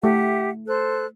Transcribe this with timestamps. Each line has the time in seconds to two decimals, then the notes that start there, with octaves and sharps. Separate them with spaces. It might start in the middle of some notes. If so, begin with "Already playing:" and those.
0.04 A3 G4 E5 F#5
0.67 A4 C5 F#6